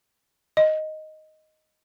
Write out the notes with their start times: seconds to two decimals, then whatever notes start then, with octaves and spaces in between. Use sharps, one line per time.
0.57 D#5